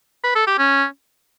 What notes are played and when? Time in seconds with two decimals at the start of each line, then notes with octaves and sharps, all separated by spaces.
0.24 B4
0.35 A4
0.47 G4
0.59 C#4